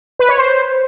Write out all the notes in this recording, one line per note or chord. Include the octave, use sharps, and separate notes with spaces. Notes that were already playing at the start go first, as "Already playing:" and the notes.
B4
C#5
C5